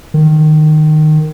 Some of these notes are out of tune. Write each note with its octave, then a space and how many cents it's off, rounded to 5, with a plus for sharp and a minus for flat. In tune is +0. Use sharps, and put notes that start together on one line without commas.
D#3 -15